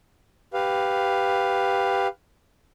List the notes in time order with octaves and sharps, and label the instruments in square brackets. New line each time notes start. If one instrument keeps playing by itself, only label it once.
[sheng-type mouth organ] G4 B4 F5